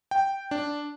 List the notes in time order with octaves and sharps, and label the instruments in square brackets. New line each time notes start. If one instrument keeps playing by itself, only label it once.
[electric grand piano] G5
D4